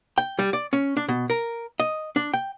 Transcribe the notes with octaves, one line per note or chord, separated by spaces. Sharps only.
G5
G3
D5
C#4
D4
B2
A#4
D#5
D4
G5